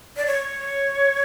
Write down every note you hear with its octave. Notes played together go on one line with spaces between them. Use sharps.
D5
C#5